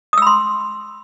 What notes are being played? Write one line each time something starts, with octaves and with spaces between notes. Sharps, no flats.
B5 C6 D#6 E6